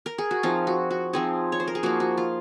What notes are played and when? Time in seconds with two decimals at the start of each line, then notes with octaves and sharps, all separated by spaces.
0.06 A#4
0.18 G#4
0.31 F#4
0.43 F3 C4 D#4 F4
0.67 F#4
0.90 F#4
1.13 F3 C4 D#4 G#4
1.52 C#5
1.60 C5
1.67 A#4
1.75 G#4
1.83 F3 A#3 D#4 F#4
2.00 F#4
2.17 F4